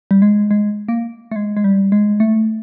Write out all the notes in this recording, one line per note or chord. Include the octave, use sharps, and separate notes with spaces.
G3
G#3
G#3
A#3
A3
G#3
G#3
G3
G#3
A3